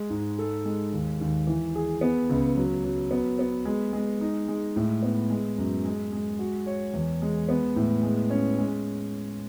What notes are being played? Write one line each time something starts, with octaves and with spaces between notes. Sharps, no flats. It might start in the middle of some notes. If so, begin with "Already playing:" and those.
Already playing: G#3
G#2
A4
G#3
D#2
D#2
E3
G#4
B3
C#2
F#3
F#3
B3
B3
G#3
G#3
D#4
G#3
A2
B3
G#3
F#2
G#3
G#3
F#4
C#5
E2
G#3
B3
A2
G#3
C#4
G#3